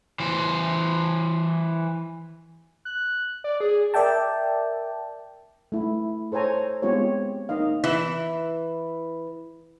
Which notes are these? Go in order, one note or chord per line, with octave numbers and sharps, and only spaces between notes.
E3 C5
F#6
D5
G#4
A#4 D5 E5 G5 A5
A3 E4
A4 C5 C#5 G#5 A#5
G#3 B3 C4 F4 G4 C#5
A#3 D#4 D#5 F5
E3 E4 E5